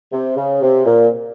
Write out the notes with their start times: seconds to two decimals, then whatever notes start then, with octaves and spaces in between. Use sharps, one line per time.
0.12 C3
0.36 C#3
0.62 C3
0.86 A#2